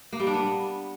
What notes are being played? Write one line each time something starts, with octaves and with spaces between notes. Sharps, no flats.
A#3
G3
D4
B3